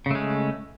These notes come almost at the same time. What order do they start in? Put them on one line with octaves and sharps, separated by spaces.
C#3 A3 G#3